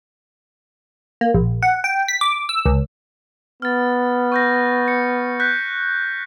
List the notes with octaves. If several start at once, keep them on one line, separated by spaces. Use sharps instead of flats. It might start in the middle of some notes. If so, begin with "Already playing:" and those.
A#3
A#1
F#5
G5
B6
D6
E6
C#2
B3 F6 A6
C#6 G6 A#6
C#7
F#6 G6 B6